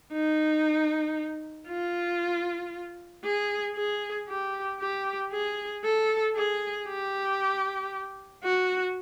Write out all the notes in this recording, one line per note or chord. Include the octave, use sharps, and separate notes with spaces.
D#4
F4
G#4
G#4
G4
G4
G#4
A4
G#4
G4
F#4